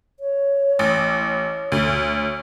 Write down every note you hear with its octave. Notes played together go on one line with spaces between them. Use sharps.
C#5
A1
C#5
D2